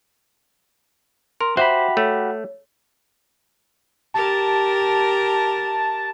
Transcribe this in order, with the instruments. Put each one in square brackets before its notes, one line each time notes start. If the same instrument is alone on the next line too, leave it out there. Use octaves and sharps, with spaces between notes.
[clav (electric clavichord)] A#4 [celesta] C6
[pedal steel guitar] F#4 G4 B5 [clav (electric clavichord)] C5 [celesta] E5
[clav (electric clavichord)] A3 [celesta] C#5
[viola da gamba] G4 A#4 [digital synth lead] A5